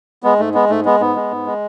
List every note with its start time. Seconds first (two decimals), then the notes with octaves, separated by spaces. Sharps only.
0.23 G#3 B3
0.39 G#2 A3
0.54 G#3 B3
0.70 G#2 A3
0.85 G#3 B3
1.00 G#2 B3
1.16 G#3
1.31 G#2
1.46 G#3